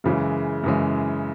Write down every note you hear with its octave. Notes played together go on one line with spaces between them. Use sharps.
F#2 C#3 E3 G#3
F#2 C#3 E3 G#3